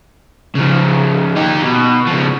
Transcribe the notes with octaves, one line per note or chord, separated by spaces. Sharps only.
C#3 F3
D#4 G4
B2
C#3 F3